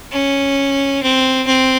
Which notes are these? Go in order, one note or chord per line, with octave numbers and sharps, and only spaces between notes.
C#4
C4
C4